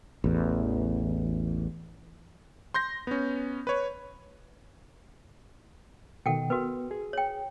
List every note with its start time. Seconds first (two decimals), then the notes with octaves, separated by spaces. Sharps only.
0.24 A1 E2
2.74 C6 G6 A#6
3.07 B3 C#4
3.67 B4 C#5
6.26 B2 D#3 A4 F#5 G5
6.50 B3 F#4 A#4 B4
6.91 G#4
7.13 C#5 G5